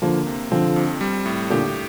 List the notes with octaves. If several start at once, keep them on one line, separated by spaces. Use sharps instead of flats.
D3 F3 A#3
C3
D3 F3 C4
F2
G3
A2
A#2 D3 G4